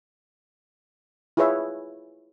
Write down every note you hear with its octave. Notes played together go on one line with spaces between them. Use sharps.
E4 F4 G#4 B4 C#5 E5